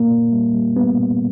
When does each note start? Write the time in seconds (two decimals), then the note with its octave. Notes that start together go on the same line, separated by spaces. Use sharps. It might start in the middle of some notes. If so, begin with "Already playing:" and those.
Already playing: A#2 A#3
0.10 A#2
0.32 G3
0.54 G3
0.76 G3 B3
0.99 A#2